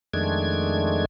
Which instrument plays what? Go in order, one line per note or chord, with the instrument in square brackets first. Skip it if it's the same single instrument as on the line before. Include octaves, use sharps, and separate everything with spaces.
[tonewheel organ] F2 D#3 G#3 A3 D4 G#6